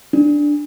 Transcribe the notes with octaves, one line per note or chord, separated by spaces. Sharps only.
D4